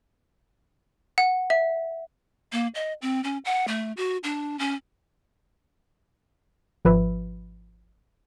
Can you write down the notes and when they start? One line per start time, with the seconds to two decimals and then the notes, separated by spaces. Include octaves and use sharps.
1.18 F#5
1.50 E5
2.52 A#3
2.75 D#5
3.02 C4
3.24 C#4
3.45 F#5
3.68 A3
3.97 F#4
4.23 D4
4.59 C#4
6.85 G#1 F3 B4 E5